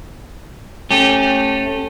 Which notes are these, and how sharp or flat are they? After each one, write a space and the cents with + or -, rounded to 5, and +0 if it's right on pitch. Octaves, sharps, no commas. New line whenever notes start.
A3 +0 C#4 -25 G4 -15